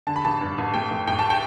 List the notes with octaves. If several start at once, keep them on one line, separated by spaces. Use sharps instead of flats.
D3 A5
B5
A1 A5
G2
A1
A3 G5
A1
A2 G5
A5
G5